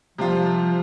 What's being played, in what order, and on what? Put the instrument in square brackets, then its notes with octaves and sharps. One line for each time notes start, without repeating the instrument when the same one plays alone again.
[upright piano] C3 G3 F4 [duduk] F3